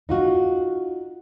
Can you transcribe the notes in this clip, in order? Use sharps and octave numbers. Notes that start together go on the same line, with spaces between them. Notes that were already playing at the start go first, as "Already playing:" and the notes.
D#4 F4 F#4